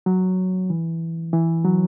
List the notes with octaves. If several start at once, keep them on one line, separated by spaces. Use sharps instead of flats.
F#3
E3
E3
F#3